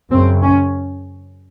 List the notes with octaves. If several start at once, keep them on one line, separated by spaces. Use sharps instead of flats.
F#2 C#3 C4
C#4